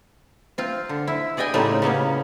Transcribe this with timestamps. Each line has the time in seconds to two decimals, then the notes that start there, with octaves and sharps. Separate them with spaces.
0.58 C4 F4
0.89 D3
1.07 E4
1.37 G#4 D5 D#5 G5 G#5
1.54 A2 C#3 G3 A#3 C4 D#4
1.82 C#3 A#3 B3 C#4